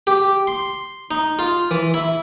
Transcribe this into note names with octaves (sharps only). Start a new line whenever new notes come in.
G4
C6
D#4
F4
E3
E4